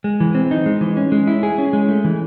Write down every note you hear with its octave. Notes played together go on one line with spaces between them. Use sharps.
G#3
E3
C4
D#4
G#3
E3
C#4
G#3
E4
G#4
C#4
G#3
A3
E3